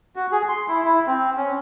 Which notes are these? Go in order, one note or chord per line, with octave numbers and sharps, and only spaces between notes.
F#4
G#4
C6
E4
E4
C4
C#4